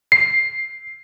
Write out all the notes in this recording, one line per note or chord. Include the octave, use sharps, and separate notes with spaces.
C7